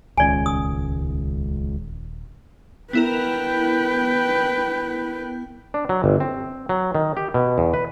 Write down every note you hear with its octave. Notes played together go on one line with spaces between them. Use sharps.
D#1 C#2 D#3 C#4 D5 G#5
D#6
B3 E4 A#4 B4 G5
D4
F#3
G1
C4
F#3
D#3
G4
B2
E2
B4